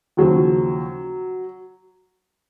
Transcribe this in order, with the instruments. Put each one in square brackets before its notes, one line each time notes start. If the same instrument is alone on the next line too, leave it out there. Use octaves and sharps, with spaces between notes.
[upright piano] D#2 C#3 F3 F#3